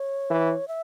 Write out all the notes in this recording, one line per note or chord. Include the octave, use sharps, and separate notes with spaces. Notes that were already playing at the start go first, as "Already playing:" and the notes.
Already playing: C#5
E3
E5